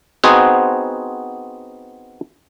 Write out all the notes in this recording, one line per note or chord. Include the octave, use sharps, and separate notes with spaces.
B3 C4 D#4 F#4 G#4 C5